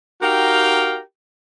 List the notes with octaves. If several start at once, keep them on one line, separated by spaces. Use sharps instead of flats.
D#4 F#4 G4 A#4 F5 G5